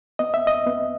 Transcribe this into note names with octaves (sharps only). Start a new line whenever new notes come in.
B3 D#5
E5
D#5
B3